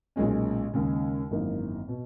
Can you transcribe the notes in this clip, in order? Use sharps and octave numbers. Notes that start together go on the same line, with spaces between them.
B1 A#2 G#3 C#4
D#2 C#3 G#3
G#1 F#2 E3 A#3 D#4
B2